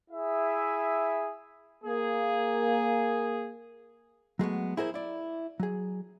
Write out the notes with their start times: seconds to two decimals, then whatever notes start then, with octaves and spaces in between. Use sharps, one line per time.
0.10 E4 G#4 E5
1.84 A#3 G#4
4.39 F#3 G#3 A3 B3
4.77 E4 G#4 A#4 C5
4.94 E4 D5
5.60 F#3 G#4